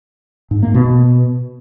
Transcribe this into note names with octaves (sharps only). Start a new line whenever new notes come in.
G#2
A#3
B2